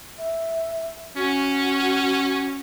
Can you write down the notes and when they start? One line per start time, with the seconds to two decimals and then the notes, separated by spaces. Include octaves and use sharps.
0.18 E5
1.16 C#4 F#4